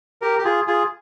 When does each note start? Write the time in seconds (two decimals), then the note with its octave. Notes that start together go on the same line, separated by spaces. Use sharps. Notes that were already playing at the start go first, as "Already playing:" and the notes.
0.22 G4 A#4
0.39 G4
0.44 F4 G#4
0.67 F4 G#4